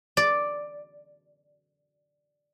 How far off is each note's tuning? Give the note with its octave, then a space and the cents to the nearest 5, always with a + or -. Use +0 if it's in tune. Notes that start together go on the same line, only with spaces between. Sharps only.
D5 +0